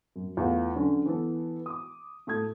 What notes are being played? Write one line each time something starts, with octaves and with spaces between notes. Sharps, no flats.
F#2
E2 A3 F4
D3 F#3 C#4
E3 B3 A4
D6 D#6
A2 A3 A4 D#6 G#6